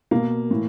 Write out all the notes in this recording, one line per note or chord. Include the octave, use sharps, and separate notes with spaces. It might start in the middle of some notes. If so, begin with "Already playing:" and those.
B2 A#3
A2 E3